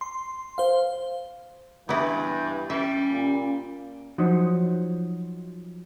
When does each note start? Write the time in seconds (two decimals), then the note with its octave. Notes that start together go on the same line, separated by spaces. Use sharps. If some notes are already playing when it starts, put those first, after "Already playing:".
0.01 C6
0.58 C5 F5
1.89 G2 E3 B3 E4
2.70 G3 C#4 E5
3.11 A#2
4.18 F3 F#3 D#4